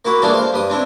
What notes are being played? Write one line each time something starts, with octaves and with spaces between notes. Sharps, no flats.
A#3 E4 F#4
E3 G3 A#3 D4 G#4 A4
C5 F5
G2 G3 D#6
C4 D4 E4